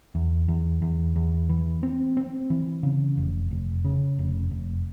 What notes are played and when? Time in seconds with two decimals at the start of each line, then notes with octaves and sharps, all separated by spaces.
0.15 E2
0.48 E2
0.82 E2
1.16 E2
1.49 E3
1.83 C4
2.17 C4
2.50 E3
2.83 C#3
3.17 F1
3.51 F1
3.85 C#3
4.19 F1
4.51 F1